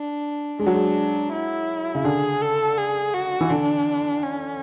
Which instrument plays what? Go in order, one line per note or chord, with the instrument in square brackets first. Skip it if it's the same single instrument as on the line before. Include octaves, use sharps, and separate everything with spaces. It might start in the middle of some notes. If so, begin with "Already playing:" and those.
Already playing: [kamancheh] D4
[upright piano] G#3 [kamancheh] D4
[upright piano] F#3
G#3
[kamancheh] E4
[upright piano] C#3
[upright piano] D3 [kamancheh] G#4
[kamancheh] A4
G#4
F#4
[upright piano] E3
[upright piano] D3 [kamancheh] D4
[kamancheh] C#4